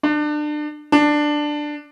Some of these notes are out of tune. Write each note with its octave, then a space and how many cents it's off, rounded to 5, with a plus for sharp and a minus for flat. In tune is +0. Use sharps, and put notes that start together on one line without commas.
D4 +30
D4 +10